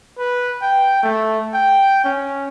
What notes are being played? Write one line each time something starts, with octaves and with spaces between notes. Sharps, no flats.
B4
G5
A3
G5
C#4